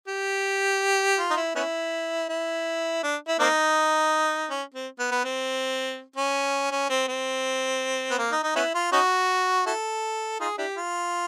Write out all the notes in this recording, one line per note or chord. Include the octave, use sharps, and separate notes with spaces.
G4
F4
D#4
E4
B3 C#4 E4
E4
D4
E4
A#3 C4 D#4
C#4
C4
B3
B3
C4
C#4
C#4
C4
C4
B3
A#3
D#4
D#4
B3 C#4 E4
F4
C#4 D#4 F#4
E4 F#4 A4
D#4 F4 G#4
D4 E4 G4
F4